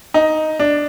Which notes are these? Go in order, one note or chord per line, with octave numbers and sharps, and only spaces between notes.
D#4
D4